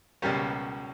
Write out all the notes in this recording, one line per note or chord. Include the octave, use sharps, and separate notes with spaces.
C#2 B2 G3 A#3 C#4 G4